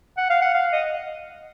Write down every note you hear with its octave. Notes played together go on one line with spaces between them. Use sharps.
F#5
F5
F#5
F5
D#5